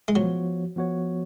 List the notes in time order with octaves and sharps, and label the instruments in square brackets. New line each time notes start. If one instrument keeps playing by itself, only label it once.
[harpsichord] G#3
[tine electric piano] F3 B3 F#4 C#5 [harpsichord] F#3
[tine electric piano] F3 B3 F#4 C#5